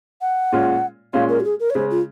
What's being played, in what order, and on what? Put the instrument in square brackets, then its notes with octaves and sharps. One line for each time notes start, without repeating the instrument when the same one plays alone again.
[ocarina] F#5
[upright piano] A#2 G#3 C#4 F4
[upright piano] A#2 G#3 C#4 F4 [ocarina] F5
[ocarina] A#4
F#4
G#4
A#4
C#5
[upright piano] C#3 G#3 C#4 [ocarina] C5
[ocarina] F4